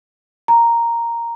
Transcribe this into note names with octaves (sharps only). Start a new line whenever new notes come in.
A#5